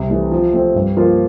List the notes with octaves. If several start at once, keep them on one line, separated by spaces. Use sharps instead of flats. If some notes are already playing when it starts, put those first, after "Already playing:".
Already playing: C2
C3 E3 A3 D4
F3
A3 C4
G2
F3 A#3 F4